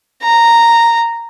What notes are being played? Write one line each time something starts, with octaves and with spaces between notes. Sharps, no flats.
A#5